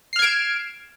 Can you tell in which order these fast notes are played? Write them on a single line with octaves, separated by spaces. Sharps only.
C7 F6 G#6 D7 E7